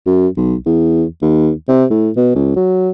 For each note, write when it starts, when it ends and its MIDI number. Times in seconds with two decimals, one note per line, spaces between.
0.06 0.27 42
0.37 0.55 35
0.66 1.05 40
1.22 1.51 39
1.68 1.85 48
1.90 2.10 45
2.17 2.32 47
2.35 2.56 37
2.56 2.90 54